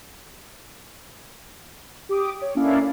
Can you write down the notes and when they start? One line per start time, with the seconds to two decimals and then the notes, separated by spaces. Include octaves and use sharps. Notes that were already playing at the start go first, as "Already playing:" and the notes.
2.09 G4 D6 D#6
2.42 C#5
2.55 A#3 C#4 D4 E4 A4 F5